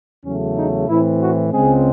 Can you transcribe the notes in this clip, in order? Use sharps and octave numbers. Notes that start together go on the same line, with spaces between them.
E2 C#3 F#3 A3 C#4
D#4
A2 E3 C4 E4
F#4
C#2 C#3 G#3 C4 G#4